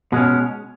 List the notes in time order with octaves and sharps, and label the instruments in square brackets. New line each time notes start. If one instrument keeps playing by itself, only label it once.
[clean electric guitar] B2 G#3 C#4